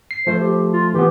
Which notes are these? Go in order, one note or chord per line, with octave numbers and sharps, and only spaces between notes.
C7
F3 A3 C5
G4
F4
E3 B3 G4